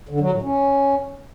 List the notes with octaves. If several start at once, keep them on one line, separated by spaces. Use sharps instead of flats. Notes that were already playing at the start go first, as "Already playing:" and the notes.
D3
F#3
A2
C#4